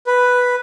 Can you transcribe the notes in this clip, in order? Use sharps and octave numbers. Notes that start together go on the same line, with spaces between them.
B4